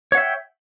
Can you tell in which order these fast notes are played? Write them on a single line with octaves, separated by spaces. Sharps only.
C#5 F#5 E5 G5